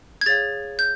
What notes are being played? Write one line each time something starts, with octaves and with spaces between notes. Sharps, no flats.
G#6
G#4 C#5 F5 A6
G6